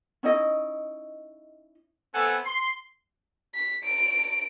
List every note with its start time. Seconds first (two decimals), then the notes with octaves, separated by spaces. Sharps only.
0.23 C#4 D#4 E4 D#5
2.14 A3 B3 C4 A4 F#5 G#5
2.46 C6
3.54 B6
3.84 D7